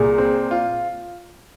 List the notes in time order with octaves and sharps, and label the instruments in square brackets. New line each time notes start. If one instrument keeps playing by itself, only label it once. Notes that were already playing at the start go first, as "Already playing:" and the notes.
Already playing: [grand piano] C2 A#2 [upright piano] G#4
[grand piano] C4
F4